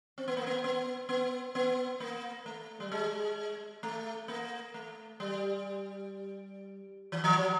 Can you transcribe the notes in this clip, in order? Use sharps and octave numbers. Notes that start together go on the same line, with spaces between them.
C4
B3
A#3
B3
B3
B3
B3
A#3
A3
G3
G#3
A3
A#3
A3
G3
E3
F3
F#3